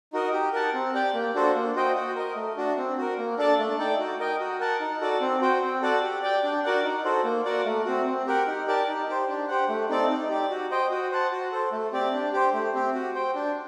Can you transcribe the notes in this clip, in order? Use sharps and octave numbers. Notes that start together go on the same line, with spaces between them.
D#4 F#4 A#4 D#5
G4
A#4 F#5 A5
C4
G4 D5 G5
A#3
D4 F#4 A4 C5
A#3
F#4 C5 D#5 G5
F#4
A#4 D#5
A3
D4 F#4
C4
F#4 A#4
A#3
D4 A4 D5 A5
A3
D#4 A4 D5 G5
F#4
A#4 D#5 G5
F#4
A#4 F#5 A5
D#4
F#4 A4 D5
C4
F#4 C5 G5
C4
F#4 A4 D5 F#5
G4
D5 G5
D4
F#4 A#4 D5 F#5
D#4
F#4 A4 C5
A#3
F#4 A#4 D5 F#5
A3
C4 F#4
C4
G4 A#4 F#5
D#4
G4 A#4 D5 A5
D#4
G4 C5
D4
G4 C5 F#5
A3
C4 D#4 A4 D5
D#4
G4 D5
F#4
C5 D#5 G5
F#4
C5 F#5 A5
F#4
A4 C5
A3
C4 G4 D5
D4
G4 C5
A3
C4 G4
F#4
C5 G5
D4